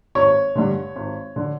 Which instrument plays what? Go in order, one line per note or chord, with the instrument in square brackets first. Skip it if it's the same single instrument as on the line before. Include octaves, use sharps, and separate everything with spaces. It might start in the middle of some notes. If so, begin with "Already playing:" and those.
[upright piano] G#1 C#5 C#6
G2 D3
G#1
D3